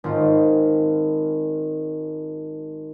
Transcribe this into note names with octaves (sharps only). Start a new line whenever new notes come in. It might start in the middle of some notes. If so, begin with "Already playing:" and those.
G#1 C4 F4